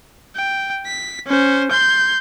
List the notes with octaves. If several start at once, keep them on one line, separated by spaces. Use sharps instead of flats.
G5
B6
C#4 C5
C6 G6